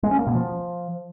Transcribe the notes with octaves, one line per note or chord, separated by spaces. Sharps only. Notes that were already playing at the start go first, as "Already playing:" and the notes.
G#3
C#4
A#3
B2
F3